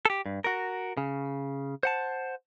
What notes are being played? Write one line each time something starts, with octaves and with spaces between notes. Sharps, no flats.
G4 A4
G2
F#4 A#4
C#3
C5 F#5 A5